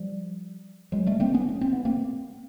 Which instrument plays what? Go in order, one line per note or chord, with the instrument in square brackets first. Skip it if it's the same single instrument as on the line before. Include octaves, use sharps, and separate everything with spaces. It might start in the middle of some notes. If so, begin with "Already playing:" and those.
Already playing: [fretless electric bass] F3 G3
F#3 G#3
G3 A3
A#3 C4
B3 C#4
C#4
C4
B3
A#3 C4